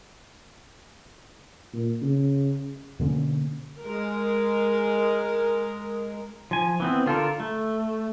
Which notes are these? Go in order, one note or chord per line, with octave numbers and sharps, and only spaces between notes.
A#2
C#3
B2 D3 A#3 C#4
G#3 A#4
F3 G#5
E3 B3 C4
D3 F4 A4 A#4
A3